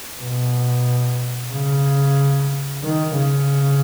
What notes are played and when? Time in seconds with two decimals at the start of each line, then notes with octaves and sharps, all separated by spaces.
0.21 B2
1.52 C#3
2.83 D#3
3.17 C#3